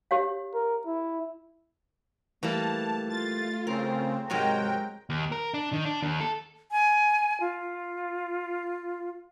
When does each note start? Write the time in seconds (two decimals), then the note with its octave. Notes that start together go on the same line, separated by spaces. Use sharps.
0.11 G4 C#5 F5
0.54 A#4
0.86 E4
2.43 E3 G3 A3 A#3 A5
3.09 F4 A6
3.67 C#3 C4 A#4
4.30 G#2 C3 F#3 G#3 A#4 G5
5.10 D#2
5.32 A#4
5.54 D4
5.73 D#3
5.85 D4
6.02 D#2
6.21 A4
6.72 G#5
7.41 F4